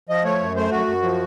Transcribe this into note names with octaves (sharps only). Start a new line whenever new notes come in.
F3 D#5
A3 C#5
F#2
A3 C5
F#2 F#4
F#2
F3